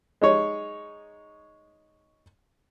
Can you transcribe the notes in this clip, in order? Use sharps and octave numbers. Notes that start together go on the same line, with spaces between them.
G#3 D#4 C#5